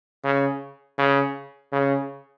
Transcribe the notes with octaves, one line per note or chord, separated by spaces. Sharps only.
C#3
C#3
C#3